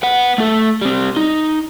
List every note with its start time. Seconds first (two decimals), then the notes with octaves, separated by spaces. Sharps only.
0.03 B4 F#5
0.38 A3 A4
0.81 G3 C4
1.16 D#4